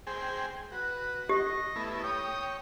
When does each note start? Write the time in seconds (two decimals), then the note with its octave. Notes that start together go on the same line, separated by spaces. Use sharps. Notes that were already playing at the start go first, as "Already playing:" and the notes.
0.07 G#4 C5 G5
0.72 F#4 B4
1.29 G4 D#5
1.76 A3 B3 E4
2.04 C#5 G5 D#6